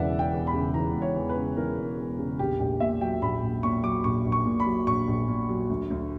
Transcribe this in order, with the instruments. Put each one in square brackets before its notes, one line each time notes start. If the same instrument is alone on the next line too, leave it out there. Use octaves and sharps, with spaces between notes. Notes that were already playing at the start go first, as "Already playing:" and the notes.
Already playing: [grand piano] E1 E2 C#3 E3 D5 E5 F#5
E1
G5
E2
B5
C#3
E3 A#5
E1
C#5
E2
B4
C#3
E3 A#4
E1
E2
C#3
A#1 G4
A#1 G4
A#2 E5
F#3 G5
A#1 B5
A#1
A#2 C#6
F#3 D6
A#1 C#6
A#1
C#6
A#2
B5
F#3
A#1 C#6
A#1
A#2
F#3
D2
D2